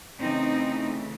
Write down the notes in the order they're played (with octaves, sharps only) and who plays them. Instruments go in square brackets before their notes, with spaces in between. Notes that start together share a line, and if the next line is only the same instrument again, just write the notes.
[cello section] C#3 E3 A3 C4 D#4